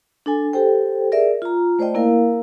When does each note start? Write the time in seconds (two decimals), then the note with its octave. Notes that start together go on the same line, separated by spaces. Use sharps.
0.26 D4 A4 G#5
0.53 G4 A4 C5 G5
1.12 G#4 A#4 D5 E5
1.42 F4 A#5
1.79 A3 C5 D5 D#5 G5
1.95 A#3 E4 A#4 F5